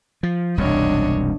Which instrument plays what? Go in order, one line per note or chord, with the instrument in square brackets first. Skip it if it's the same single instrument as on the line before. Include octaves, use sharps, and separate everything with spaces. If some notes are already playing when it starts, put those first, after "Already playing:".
[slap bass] F3
[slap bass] E1 C2 F#2 [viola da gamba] D4 C#5 D#5